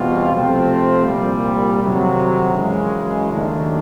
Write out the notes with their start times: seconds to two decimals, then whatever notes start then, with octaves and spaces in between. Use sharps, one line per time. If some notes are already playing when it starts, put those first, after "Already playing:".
Already playing: E2 B2 G3 C4 F4
0.32 C3 F3 A3 C4
1.06 C2 A#2 G3
1.81 F2 C3 D#3 F#3
2.55 F#2 C#3 E3 G#3
3.31 D#2 D#3 F#3 A3 D4